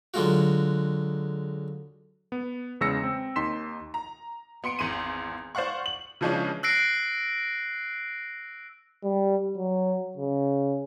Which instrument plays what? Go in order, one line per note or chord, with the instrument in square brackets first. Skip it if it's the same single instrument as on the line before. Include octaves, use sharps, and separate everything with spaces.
[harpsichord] D3 F#3 G#3 F4 F#4
[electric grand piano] B3
E2 C#3 G#3 E6 A#6 C#7
C4
D#2 D#4 C6 B6 E7
[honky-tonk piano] A#5
B3 C6 C#7 D7
G#1 E2 C6 D#7
C5 D5 F5 F#5 C#6
F#7
C#3 E3 F3 G#3 C#4 D4
[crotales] E6 F#6 A#6 C7 D7
[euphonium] G3
F#3
C#3